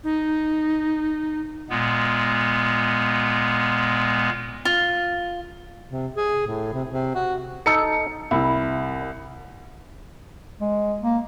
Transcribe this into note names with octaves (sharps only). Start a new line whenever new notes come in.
D#4
A#2 G#3 B3
F4
C3
G#4
A2
C3
C3
F#4
D#4 A4 C#7
C2 E4
G#3
A#3